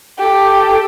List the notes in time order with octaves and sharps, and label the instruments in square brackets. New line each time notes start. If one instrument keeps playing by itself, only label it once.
[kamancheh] G4 A4